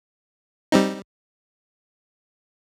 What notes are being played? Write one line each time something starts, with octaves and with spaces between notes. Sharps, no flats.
G3 C4 D#4